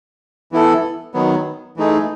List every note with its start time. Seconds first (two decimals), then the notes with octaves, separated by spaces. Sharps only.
0.52 E3 B3 E4 A4
1.14 D#3 F#3 B3
1.77 E3 A3 D#4 G#4